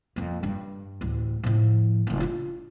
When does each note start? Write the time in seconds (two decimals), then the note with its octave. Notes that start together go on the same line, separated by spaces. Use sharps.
0.16 F2 A#3
0.43 G2 D4
1.01 A1 D2
1.43 A2 F3
2.07 F#1 D2
2.20 D4 F4